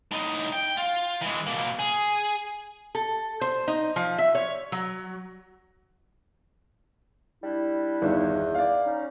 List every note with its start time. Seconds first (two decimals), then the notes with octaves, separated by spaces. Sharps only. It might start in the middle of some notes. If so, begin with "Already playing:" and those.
0.11 A2 D#4
0.53 G5
0.78 F4
1.22 E3 G#3
1.47 B2 A#3
1.79 G#4
2.95 A4
3.41 C5
3.68 D#4
3.96 F3
4.18 E5
4.35 C#5
4.72 F#3
7.44 G3 D4 E4
8.02 G1 E2 D#3
8.55 D5 F5
8.85 C#4 D#4